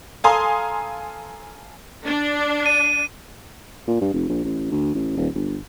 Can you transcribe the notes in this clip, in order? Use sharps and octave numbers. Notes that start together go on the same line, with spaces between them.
A4 F5 G#5 A#5 C6 D#6
D4
D#7
A#2
G2
F1
A#1
A1
D2
A1
D#1
G1